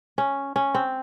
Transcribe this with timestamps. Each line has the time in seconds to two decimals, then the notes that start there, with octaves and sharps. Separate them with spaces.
0.18 C#4
0.56 C#4
0.74 C4